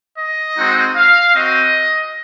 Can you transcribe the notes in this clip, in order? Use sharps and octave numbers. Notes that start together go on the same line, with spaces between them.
D#5
G#3 C4 D#4 F#4
F5
C4 F#4 D#5